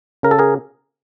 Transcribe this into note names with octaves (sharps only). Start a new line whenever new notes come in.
C#3 A#4
A4
G#4 A#4